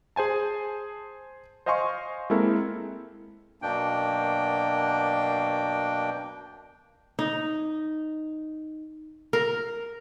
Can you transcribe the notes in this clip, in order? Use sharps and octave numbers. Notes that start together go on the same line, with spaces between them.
G#4 C5 G#5 A5
C5 D#5 F5 G#5 C6 C#6
G#3 A#3 C4 E4 A4 A#4
F#2 B2 A#3 D4 G5
D#4
A#4